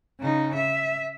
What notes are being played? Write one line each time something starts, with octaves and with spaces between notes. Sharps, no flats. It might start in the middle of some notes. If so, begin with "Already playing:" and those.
C#3 D#4
E5